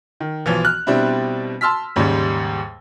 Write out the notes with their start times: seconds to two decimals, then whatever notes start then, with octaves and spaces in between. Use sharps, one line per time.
0.20 D#3
0.46 B1 E3 F3
0.65 F6 F#6
0.87 B2 G3 C4 D4 E4
1.61 A5 C6 E6 F6 B6
1.96 D#2 G#2 C#3 G3 G#3